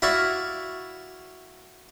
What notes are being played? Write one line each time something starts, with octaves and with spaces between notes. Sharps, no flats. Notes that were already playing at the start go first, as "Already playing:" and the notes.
E4 F#4 D5 F5 C#6